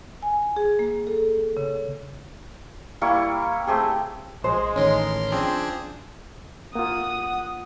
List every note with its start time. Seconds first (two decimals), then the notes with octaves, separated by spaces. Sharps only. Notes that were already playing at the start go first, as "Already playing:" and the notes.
0.22 G#5
0.56 G#4
0.79 A#3
1.07 A4
1.57 C#3
3.01 G3 A#3 E4 C#6
3.67 A3 C4 G4 G#4
4.44 A#1 G#3 C5
4.76 A1 D#3 C#4 A#4 C6
5.32 F3 C4 D4 G#4
6.75 A#3 F4 F#5 D#6